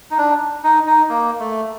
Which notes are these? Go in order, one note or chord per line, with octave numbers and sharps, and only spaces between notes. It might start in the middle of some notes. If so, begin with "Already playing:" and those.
D#4
D4
D#4
D#4
A#3
A3